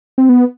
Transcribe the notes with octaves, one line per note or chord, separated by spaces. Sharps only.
C4
B3